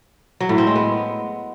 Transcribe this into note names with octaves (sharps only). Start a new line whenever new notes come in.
F#3
A2
C4
G#3
B3